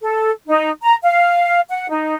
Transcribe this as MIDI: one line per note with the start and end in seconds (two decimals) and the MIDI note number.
0.01 0.30 69
0.47 0.70 63
0.83 0.95 82
1.03 1.60 77
1.69 1.88 78
1.90 2.15 63